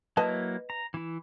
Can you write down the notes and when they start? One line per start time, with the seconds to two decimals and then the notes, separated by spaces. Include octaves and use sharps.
0.17 F#3 A#3 E4 B4 D#5 A5
0.70 A#5
0.94 E3 E4